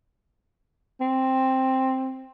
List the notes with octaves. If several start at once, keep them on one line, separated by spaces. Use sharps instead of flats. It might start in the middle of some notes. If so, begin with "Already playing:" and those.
C4